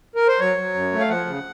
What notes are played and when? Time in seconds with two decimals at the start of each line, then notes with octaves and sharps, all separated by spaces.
0.15 A#4
0.28 C5
0.40 F#3 C#5
0.58 F#3
0.74 F#2
0.92 A3
1.00 F5
1.09 F3 F#5
1.26 C#3